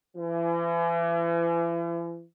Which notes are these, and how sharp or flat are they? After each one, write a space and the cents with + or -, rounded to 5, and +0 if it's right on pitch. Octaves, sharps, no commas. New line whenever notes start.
E3 +40